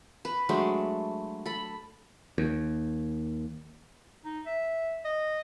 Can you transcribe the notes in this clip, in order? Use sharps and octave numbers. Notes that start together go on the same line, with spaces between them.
B4
F#3 G#3 A3 D4
A4 B5
D#2
D#4
E5
D#5